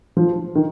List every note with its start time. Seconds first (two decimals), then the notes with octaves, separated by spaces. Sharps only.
0.17 F3
0.55 D#3